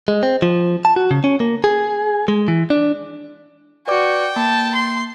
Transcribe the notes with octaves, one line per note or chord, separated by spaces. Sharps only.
G#3
C4
F3
A5
F#4
C#3
C#4
A#3
G#4
G#3
E3
D4
F#4 B4 D5 G5 D6
A#3 A5
C6